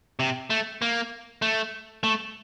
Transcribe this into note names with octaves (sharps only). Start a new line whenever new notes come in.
C3
A3
A#3
A3
A3